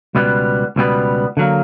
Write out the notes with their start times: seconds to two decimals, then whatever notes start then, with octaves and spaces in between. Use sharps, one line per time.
0.15 C#2 B2 G3 B3
0.76 C#2 B2 G3 B3
1.37 D3 F#3 A#3